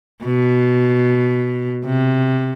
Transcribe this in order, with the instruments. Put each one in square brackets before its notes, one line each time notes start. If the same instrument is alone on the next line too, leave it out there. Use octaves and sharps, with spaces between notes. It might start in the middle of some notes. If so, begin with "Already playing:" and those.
[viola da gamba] B2
C3